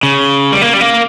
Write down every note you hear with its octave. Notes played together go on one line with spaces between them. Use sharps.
C#3
G3
A#3
G3
A#3